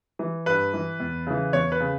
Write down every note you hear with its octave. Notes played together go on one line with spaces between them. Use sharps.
E3
G2 B4
E3
E2
C#3 E3
E2 C#5
B4
C#3